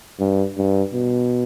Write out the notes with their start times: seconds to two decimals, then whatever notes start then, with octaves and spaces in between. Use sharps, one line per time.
0.20 G2
0.57 G2
0.94 B2